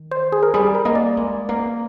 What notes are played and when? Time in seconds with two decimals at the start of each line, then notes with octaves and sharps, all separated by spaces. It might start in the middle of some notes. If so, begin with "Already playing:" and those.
Already playing: D#3
0.11 C5
0.32 G#4
0.43 A#4
0.54 G3 G#4
0.75 A#4
0.85 A#3 D#5
0.95 D5
1.17 G#3
1.49 A#3